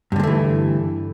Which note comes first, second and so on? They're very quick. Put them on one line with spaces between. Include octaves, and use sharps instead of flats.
G2 D3 G#3 A3 E3